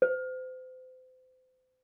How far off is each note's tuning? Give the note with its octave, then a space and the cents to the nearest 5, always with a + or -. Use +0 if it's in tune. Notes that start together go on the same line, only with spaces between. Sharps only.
C5 -35